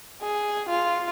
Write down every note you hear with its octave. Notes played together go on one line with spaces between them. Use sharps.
G#4
F4